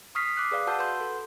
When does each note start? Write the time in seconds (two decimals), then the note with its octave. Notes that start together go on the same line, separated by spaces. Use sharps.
0.15 C#6 D#6 F6 B6 C7
0.36 D6 D#6 F#6 C7
0.51 G#4 B4 D5 F5
0.67 F#4 B4 F#5 A5 E6 G6
0.79 B4 F#5 C6 G6
1.00 A4